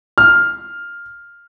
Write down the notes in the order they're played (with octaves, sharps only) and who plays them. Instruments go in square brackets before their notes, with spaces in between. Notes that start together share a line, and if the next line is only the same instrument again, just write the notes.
[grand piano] F6